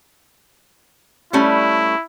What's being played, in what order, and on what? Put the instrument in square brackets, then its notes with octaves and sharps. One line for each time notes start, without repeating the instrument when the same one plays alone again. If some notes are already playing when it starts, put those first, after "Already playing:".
[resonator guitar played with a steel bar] G3 A3 C#4 [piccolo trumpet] E4